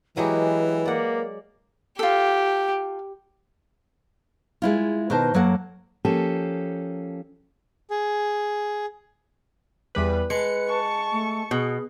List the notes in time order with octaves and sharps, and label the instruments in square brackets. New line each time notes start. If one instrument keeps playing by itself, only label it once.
[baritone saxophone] E3 [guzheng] F#3 G#3 G4 [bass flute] B4
[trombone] A#3 [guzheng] D5 F#5
[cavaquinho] F4 A4 [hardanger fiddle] G4
[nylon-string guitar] G#3 E4 F4
B2 D#3 C5 A5
F#2 F#3 A#3 A4 F#5
[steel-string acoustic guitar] F3 A#3 C#4 G4 A4
[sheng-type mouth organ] G#4
[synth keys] E2 G3 B4
[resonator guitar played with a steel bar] G#3 [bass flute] B4 [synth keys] C#7
[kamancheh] A5 C#6
[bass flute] A3
[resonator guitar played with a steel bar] B2 [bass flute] G#4